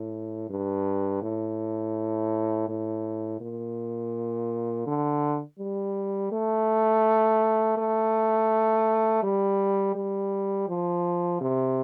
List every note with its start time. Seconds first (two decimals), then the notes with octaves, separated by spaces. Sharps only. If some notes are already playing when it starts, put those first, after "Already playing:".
Already playing: A2
0.50 G2
1.22 A2
2.69 A2
3.40 A#2
4.87 D3
5.59 G3
6.32 A3
7.78 A3
9.23 G3
9.95 G3
10.68 F3
11.41 C3